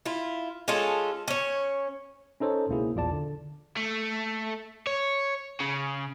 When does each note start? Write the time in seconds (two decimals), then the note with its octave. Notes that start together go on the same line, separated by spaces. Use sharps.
0.06 E4 F4
0.68 G#3 C#4 F4 A4
1.28 C#4 C#5
2.40 C#4 D#4 A4 C5 C#5
2.69 C#2 B2 A#3 E4 G#4
2.95 A#1 E2 F4 D5 A5
3.12 D3
3.76 A3
4.87 C#5
5.60 C#3